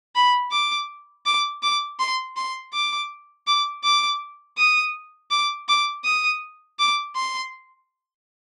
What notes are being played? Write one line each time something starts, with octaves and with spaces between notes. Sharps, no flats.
B5
D6
D6
D6
C6
C6
D6
D6
D6
D#6
D6
D6
D#6
D6
C6